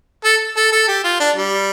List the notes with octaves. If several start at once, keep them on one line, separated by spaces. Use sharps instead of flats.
A4
A4
A4
G4
F4
D4
G3